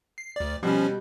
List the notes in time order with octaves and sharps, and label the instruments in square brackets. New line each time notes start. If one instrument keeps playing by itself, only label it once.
[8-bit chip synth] C7
D2 D5
[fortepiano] B2 G3 [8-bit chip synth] F3 C#4